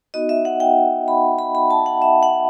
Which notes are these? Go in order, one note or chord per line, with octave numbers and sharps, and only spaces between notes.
B3 D#4 F#4 D#5
E5
F#5
G5
B5
B5
B5
A5
F#5
E5
F#5